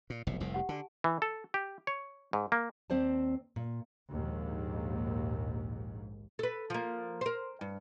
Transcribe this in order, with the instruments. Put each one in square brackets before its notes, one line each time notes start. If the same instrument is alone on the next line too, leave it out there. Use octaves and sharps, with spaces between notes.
[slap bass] A#2
F1 B1 A2
F1 C2 A2
[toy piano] G4 F#5
[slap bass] D3 [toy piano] G4 G#5 A5
[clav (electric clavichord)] E3
A4
G4
C#5
G#2
A#3
[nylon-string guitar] D#2 C4 C5 D5 A5
A#2
[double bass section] A#1 D#2 G#2
[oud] A4 B4
F3 A#3
A#4 C5
G2